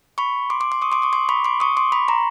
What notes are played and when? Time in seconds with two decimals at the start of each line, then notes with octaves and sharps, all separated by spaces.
0.18 B5 C#6
0.50 C6 D6
0.61 C6 D6
0.72 C6 D6
0.82 C#6 D#6
0.92 C6 D6
1.02 C#6 D#6
1.13 C6 D6
1.29 B5 C#6
1.44 C6 D6
1.60 C#6 D#6
1.77 C6 D6
1.92 B5 C#6
2.08 A#5 C6